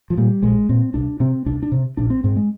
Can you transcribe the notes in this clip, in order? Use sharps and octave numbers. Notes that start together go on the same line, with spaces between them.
F3
A#2 G3
A#1 G#3
A#2 C4
C2 D4
C3 C4
C2 D4
D4
C3
A#1 D4
C4
G#2 C4
G#3